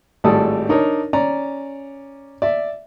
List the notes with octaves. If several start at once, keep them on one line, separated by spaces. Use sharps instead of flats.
G#1 A2 G3 A4 D5 D#6
D4 D#4 A#4 C#5
C#4 D5 A#5
D5 E5